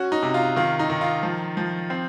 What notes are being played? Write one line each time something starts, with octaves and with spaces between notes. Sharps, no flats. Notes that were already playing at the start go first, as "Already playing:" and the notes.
Already playing: C#4 F#4
D#4
C3
F4
D#3 F4
D#4
D#3
F4
F3
F3
C4